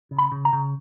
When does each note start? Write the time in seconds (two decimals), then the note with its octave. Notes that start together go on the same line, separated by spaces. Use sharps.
0.11 C#3
0.18 B5
0.32 C#3
0.45 A#5
0.53 C#3